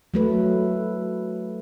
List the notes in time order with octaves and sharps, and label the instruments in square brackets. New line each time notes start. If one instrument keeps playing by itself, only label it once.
[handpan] F#3 A3 B4